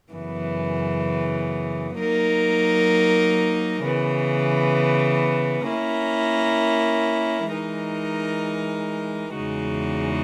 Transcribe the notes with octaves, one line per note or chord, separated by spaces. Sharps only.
F#2 C#3 E3 B3
F#3 A#3 D#4 A#4
C#3 E3 B3
A#3 C#4 E4 A#4
E3 G#3 D#4 A#4
E2 C#3 G#3 D#4 F#4